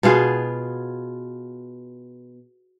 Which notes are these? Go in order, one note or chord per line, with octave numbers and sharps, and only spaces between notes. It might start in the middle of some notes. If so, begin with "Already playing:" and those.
B2 B3 F4 G#4